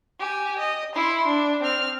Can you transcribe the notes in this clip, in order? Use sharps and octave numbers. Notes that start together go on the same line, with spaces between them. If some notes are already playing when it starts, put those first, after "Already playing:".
G4 G#5
D#5
E4 C6
D4
C4 F6